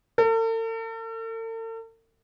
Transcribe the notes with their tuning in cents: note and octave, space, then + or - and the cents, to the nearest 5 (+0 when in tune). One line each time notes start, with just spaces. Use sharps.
A4 +45